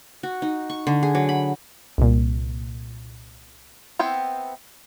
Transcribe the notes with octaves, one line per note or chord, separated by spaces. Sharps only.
F#4
D#4
C#6
D3
G#4
F#3
B5
C2 A#2
B3 C4 E4 G5